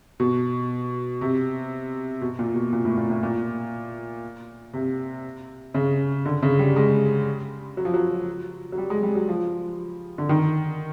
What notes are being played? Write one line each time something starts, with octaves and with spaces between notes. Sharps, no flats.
B2
C3
B2
A#2
B2
A#2
A2
A#2
A2
A#2
C3
C#3
D3
C#3
G3
G#3
F#3
F3
F#3
F#3
G3
G#3
G3
F#3
F3
D3
D#3